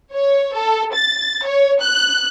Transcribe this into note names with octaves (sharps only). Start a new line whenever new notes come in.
C#5
A4
A6
C#5
F#6